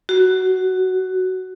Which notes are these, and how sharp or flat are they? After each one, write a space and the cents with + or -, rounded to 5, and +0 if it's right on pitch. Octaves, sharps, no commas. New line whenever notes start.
F#4 +10